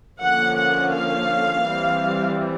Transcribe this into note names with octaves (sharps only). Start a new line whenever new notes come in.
D3 F3 A#3 C#4 F#5
F#5
F5
E3 G3 C4